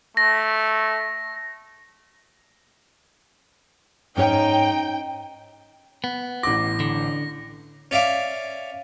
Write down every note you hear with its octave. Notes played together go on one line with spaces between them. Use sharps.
A3 A#6
G#2 C#4 D#4 C#5 G5
B3
A1 D6 A#6
D3
C#4 D5 E5 F5 D6